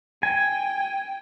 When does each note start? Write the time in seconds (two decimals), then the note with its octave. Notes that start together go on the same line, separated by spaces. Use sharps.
0.23 G5 G#5